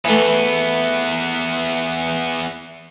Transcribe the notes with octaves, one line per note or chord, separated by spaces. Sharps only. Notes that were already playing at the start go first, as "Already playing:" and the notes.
E2 E3 A3 B3